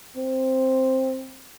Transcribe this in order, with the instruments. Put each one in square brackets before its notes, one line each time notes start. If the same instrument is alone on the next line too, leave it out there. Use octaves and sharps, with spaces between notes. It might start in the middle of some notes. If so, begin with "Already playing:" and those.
[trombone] C4